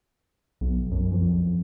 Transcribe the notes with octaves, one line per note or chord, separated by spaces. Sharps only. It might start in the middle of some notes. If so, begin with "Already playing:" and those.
B1
F#2
F2